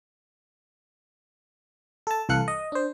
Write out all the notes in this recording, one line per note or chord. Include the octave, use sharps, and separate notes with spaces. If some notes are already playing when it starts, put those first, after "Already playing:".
A4 A5
C2 E3 A4 F5 F#6 C#7
D#5
D4 C5